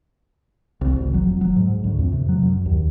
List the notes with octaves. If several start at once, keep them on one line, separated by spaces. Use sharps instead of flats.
C2
G#1
F#3
F1
F#3
G#2
D2
F2
C3
F#3
F#2
D#2